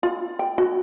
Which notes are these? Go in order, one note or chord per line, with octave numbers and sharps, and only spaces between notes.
F4
G5
F#4